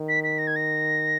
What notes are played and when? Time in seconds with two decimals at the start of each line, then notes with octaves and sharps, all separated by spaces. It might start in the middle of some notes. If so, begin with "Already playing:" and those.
Already playing: D#3
0.09 B6
0.24 B6
0.38 A#6
0.47 G#6
0.56 A#6